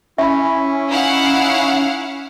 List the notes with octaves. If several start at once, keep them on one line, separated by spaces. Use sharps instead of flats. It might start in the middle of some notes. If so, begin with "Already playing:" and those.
C#4 E4 E5 B5
D#4 E4 F5 F#5